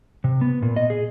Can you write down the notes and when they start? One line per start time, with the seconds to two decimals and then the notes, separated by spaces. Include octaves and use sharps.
0.24 C3
0.41 B3
0.62 A#2
0.76 D#5
0.90 G#4